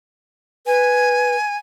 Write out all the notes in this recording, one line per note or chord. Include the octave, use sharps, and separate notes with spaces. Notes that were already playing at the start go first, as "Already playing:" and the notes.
B4 G#5